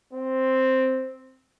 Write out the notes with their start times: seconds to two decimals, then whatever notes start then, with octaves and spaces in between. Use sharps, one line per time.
0.13 C4